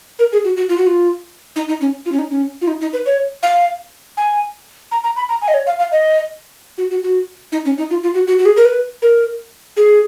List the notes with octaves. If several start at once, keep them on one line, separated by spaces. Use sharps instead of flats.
A#4
G#4
F#4
F#4
F4
F#4
F4
D#4
D#4
C#4
F4
C#4
D#4
C#4
F4
D#4
D#4
B4
C#5
F5
G#5
A#5
A#5
B5
A#5
G#5
D#5
C#5
F5
F5
D#5
F#4
F#4
F#4
D#4
C#4
D#4
F4
F4
F#4
F#4
F#4
G#4
A#4
B4
A#4
G#4